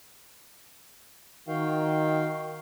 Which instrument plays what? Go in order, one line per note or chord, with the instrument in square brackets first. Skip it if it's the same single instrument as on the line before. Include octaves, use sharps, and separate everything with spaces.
[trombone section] D#3 [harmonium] F#4 F5 G5